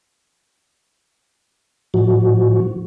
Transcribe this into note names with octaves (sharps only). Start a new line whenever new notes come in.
A2 F3 F#4